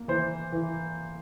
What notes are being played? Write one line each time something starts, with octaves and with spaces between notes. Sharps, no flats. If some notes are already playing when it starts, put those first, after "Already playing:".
Already playing: A#3
E3 C5
E3